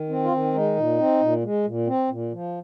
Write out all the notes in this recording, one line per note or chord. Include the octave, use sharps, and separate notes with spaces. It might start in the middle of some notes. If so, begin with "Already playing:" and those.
Already playing: D#3
C4
F4
D#3
G#3 D#4
A#2
C4
A#2
G#3
A#2
C4
A#2
F3